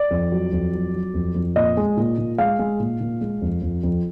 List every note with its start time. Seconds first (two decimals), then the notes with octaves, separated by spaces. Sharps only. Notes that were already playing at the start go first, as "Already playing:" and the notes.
Already playing: D5
0.11 F2
0.32 F#3
0.53 F2
0.73 F#3
0.95 F#3
1.14 F2
1.35 F2
1.56 A#2 D#5
1.77 G#3
1.97 A#2
2.18 A#2
2.38 G#3 F5
2.59 G#3
2.80 A#2
3.00 A#2
3.21 G#3
3.42 F2
3.62 F2
3.83 F2